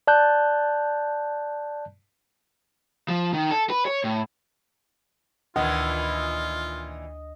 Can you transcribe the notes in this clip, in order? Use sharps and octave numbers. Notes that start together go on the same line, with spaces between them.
D5 A5 F#6 G6
F3
D#3
A4
B4
C#5
A2
D2 A#2 D#3 E3 F4 D#5